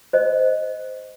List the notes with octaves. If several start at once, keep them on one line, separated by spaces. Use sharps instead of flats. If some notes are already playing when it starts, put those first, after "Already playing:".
C5 D#5